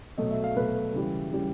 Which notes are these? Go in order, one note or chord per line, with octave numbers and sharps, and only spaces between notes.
B2 F#3 A3 D#5
E5
F5
B2 F#3 A3 B4
C#3 E3 G3
C#3 E3 G3